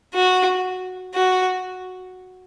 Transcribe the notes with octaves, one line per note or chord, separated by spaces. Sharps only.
F#4
F#4